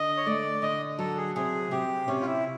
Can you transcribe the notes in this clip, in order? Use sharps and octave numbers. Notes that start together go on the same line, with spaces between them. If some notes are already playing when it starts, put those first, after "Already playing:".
Already playing: D3 D#5
C#5
A3 D5
D3 D#5
F#3 A4
G#4
C3 G#4
C3 G4
C3 C#4
F4
E4